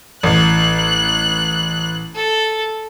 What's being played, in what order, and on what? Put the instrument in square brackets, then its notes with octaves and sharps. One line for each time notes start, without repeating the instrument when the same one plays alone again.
[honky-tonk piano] A1 [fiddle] F#6
[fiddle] A4